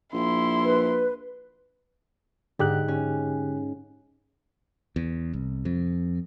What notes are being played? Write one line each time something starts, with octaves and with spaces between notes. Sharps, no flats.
A#1 E4 C6
B4
G#2 D3 G4 F#6
C#4
E2
C2
F2